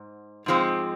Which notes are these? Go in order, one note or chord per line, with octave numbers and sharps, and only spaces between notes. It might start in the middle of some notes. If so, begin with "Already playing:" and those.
Already playing: G#2
G#2 F3 G#3 C4